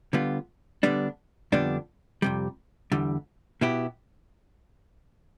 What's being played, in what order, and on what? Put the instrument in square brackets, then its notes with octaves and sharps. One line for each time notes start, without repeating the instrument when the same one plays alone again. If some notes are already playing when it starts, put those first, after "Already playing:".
[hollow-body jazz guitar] D3 G3 B3 F4
D3 G3 B3 D4
F2 D3 G3 B3 D4
F2 C3 G3
E2 D3 G3
B2 B3 E4 G4